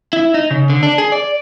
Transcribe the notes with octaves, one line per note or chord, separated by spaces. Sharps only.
E4
D#4
C#3
D3
D4
G#4
D5